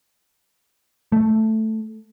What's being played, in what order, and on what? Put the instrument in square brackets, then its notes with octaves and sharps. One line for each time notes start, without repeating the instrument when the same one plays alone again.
[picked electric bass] A3